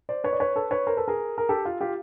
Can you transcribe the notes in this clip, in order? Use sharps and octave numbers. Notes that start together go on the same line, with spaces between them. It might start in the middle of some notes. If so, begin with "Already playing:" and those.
C5 D5
B4 C#5
D5
B4 C#5
A4 B4
B4 C#5
A#4 C5
A4 B4
G#4 A#4
A#4
G4 A4
F4
F4 G4